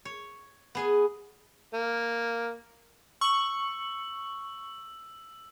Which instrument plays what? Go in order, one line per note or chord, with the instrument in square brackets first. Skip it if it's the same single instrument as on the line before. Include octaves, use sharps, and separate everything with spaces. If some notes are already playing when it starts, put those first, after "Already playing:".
[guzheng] C#5
B3 G#4 G#5
[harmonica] A#3
[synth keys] C#6 [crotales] E6 F#7